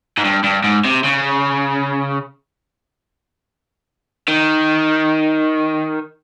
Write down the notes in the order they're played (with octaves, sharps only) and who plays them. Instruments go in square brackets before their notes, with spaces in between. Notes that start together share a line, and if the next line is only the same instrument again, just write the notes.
[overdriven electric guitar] G#2
G2
G2
G#2
C3
C#3
D#3